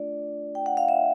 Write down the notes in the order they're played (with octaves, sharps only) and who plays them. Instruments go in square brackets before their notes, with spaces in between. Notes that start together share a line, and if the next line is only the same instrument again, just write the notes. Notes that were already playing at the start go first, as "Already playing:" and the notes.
Already playing: [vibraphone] A3 D4 F4 D5
G5
F#5
F5
E5